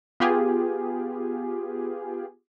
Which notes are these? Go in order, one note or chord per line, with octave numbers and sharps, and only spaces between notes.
B3 F4 G4 G#4